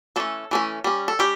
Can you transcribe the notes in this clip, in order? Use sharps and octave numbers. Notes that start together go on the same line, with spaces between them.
E3 A3 C#4 A4
E3 A3 C#4
G3 C#4
A4
G3 C#4 G4